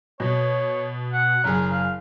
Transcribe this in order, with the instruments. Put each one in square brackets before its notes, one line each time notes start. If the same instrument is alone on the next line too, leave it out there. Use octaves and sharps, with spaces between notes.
[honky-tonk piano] B2 [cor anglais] C#5
[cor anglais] F#5
[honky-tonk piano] F#1 G#4 [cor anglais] A#4
[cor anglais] F5